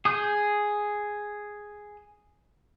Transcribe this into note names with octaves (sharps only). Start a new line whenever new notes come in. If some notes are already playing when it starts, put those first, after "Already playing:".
G#4 D#6 G6